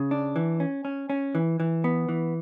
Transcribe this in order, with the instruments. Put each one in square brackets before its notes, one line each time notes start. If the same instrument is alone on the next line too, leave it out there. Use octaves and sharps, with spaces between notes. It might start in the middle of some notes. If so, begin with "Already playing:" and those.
Already playing: [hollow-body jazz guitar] C#3
D4
E3
C#4
C#4
C#4
E3
E3
B3
E3